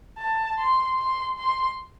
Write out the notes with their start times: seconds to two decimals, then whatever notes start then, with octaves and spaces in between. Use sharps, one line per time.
0.18 A5
0.58 C6
0.98 C6
1.38 C6